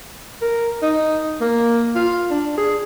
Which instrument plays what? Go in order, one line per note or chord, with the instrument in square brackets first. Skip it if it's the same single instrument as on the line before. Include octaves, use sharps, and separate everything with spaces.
[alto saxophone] A#4
D#4
A#3
F4
D4
G#4